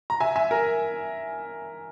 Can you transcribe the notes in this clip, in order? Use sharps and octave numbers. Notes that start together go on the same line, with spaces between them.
A#5
E5 G#5
E5 G#5
A#4